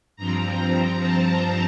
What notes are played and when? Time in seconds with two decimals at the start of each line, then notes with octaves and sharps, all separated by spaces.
0.16 G2 F3 C4 A#5
1.00 A5